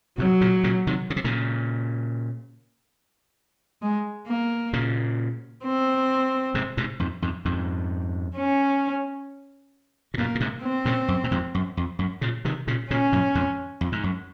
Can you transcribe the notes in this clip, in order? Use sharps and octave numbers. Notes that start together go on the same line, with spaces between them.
G#2 C3 F#3
A#2 C#3
A#2 C#3
C3 D#3
C#3
C3
A#2 C#3
G#3
A#3
A#2 C#3
C4
G#2 C3
G#2 C3
F2 G#2
F2 G#2
F2 G#2
C#4
C3
F#2 A#2 A#3
A#2
G#2 C3
C4
A#2 C#3
F#2
A#2
F2 G#2
F#2
F2
F#2
A#2 C#3
C3 D#3
A#2 C#3
A#2 C#3 C#4
F#2 A#2
F2 G#2
F2
G#2
F#2